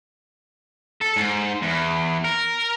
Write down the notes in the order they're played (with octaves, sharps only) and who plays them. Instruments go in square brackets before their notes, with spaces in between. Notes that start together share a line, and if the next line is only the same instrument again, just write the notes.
[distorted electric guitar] A4
G#2
E2
A#4